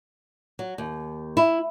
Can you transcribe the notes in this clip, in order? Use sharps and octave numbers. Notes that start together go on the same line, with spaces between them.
F#3
D#2
E4